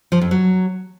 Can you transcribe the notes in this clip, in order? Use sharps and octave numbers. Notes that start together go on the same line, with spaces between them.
F3
F2
F#3